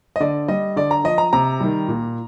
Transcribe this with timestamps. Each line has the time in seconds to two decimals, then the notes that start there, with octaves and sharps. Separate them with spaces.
0.16 D#5
0.20 D3 D5
0.48 G3 D#5
0.76 D3 D5
0.91 A#5
1.04 F3 D#5
1.18 A#5
1.33 C3 A#5
1.60 D#3 G3
1.88 A#2